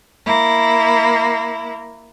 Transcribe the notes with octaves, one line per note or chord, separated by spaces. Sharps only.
A#3 E4